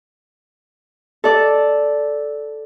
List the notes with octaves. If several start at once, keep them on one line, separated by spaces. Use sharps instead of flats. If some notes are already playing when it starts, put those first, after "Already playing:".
A4 D5